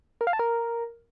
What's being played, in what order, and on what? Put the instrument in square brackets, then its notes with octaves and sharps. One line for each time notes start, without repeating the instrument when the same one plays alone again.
[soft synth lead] A#4
F5
A5
A#4